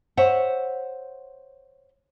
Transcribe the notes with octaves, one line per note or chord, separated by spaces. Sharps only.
C5 C#5 E5 F#5